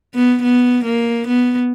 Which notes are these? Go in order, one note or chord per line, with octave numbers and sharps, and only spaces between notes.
B3
B3
A#3
B3